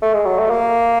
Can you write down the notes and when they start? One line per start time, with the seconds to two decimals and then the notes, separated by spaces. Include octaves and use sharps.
0.02 A3
0.14 G#3
0.26 F#3
0.38 A3
0.50 A#3